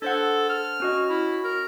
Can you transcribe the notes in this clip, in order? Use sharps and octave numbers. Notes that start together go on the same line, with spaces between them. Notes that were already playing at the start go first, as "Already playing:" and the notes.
D4 A4 C5 F#5
F6
C#4 F#4 D#5
E4
A#4